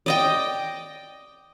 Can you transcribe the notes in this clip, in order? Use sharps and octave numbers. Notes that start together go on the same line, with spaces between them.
D5 D#5 G5